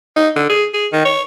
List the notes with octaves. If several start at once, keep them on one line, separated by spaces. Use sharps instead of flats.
D#4
D3
G#4
G#4
D#3
C#5